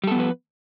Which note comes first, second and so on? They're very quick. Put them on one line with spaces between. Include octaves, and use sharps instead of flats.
G3 A4 B3 F3 B4